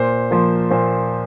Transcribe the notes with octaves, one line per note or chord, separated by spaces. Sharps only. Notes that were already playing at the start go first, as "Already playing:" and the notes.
Already playing: A#2 C5
F3 A#3
A#2 C5